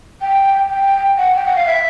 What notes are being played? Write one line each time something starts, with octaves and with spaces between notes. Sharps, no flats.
G5
G5
F#5
G5
F#5
F5
E5